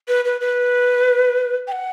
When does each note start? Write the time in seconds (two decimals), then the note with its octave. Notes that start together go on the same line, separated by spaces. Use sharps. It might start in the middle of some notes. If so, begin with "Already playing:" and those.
0.08 B4
0.25 B4
0.41 B4
1.68 G5
1.72 F#5